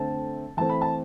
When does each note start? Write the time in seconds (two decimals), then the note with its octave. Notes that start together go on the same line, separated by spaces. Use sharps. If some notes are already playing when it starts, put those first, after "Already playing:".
Already playing: D3 A3 C4 A5
0.57 E3 A3 C4 A5
0.69 B5
0.82 A5